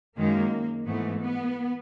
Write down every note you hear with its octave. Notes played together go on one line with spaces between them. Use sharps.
F#2 D#3 G#3 A#3
G#2 E3 A3 B3
B3